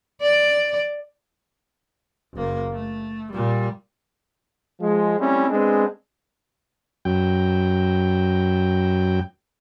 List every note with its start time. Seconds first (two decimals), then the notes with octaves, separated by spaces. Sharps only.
0.22 D5
2.33 F#1 A#3
2.73 A3
3.32 A#2 G3
4.80 F3 G#3
5.19 G3 A3 C4 C#4 E4
5.50 G#3 B3 C4 D4 G#4
7.05 F#2 G5